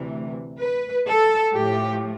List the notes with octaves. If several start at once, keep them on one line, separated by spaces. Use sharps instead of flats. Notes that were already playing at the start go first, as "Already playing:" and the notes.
Already playing: D2 C3 E3
B4
A4
A2 F3 A3 G4